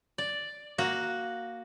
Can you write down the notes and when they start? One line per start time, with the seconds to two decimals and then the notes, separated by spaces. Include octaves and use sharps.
0.18 D5
0.78 A#3 F#4